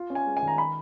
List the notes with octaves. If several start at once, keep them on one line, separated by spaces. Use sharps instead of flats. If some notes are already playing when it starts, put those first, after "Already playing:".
Already playing: F4
C#4
G#5
G#3
G#5
D#3
A#5
B5